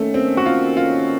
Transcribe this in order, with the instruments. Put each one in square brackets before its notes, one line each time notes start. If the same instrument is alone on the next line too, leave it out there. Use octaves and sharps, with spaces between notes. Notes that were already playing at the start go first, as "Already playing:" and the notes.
Already playing: [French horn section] D#3 A#3 C#4 [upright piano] A3
[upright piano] C4
F#4
F4
F4